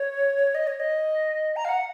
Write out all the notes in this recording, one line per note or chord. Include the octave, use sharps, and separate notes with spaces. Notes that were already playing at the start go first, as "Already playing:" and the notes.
Already playing: C#5
D#5
C#5
D#5
A#5
F5
F#5